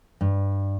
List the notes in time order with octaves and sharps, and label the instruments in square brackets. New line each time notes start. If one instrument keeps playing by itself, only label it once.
[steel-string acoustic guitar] G2